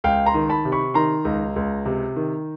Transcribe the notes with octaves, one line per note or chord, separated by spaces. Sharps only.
C#2 F5 G5
A#5 C6
D#3
A5 B5
C3
B5 C#6
D#3 A#5 C6
C#2
C#2
C3
D#3